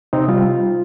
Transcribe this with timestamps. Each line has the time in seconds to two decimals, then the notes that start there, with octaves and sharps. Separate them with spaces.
0.13 C3 C4 D#4
0.28 G3 F4